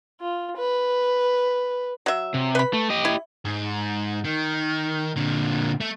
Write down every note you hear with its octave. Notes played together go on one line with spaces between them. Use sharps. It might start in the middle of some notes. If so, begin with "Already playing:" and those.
F4
B4
F#3 E5
C3
B4 B5
A3
G4 D#5
E4
G#2
D#3
A#2 D3
A3